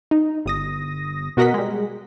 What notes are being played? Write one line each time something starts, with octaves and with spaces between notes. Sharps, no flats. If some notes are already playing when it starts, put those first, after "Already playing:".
D#4
G1 D#6 A#6
B2 F#4 A#4 D#5 F#5 B6
G3 G#3